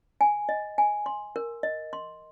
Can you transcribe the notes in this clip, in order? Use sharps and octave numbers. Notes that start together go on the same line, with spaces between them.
G#5
D#5
G#5
C6
A#4
D#5
C6